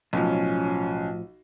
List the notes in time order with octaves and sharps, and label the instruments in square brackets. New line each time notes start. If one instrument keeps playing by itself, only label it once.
[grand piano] B1 [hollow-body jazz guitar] A2 F3 [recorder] C#4